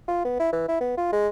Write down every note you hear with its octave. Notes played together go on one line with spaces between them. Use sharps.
F4
B3
E4
E3
E4
B3
F4
G#3